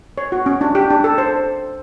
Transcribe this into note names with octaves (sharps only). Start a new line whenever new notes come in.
C#5
F#4
C#4
D4
G4
D4
A4
C5